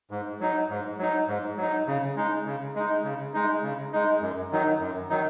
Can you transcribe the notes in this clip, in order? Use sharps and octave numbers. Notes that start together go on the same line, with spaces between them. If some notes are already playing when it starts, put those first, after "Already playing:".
G#2
F#3 D#4
G#2
F#3 D#4
G#2
F#3 D#4
C#3
G#3 D#4
C#3
G#3 D#4
C#3
G#3 D#4
C#3
G#3 D#4
F#2
D#3 F#3 D#4
F#2
D#3 F#3 D#4